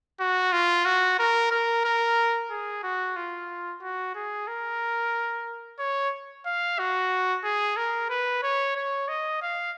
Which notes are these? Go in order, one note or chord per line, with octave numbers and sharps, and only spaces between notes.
F#4
F4
F#4
A#4
A#4
A#4
G#4
F#4
F4
F#4
G#4
A#4
C#5
F5
F#4
G#4
A#4
B4
C#5
C#5
D#5
F5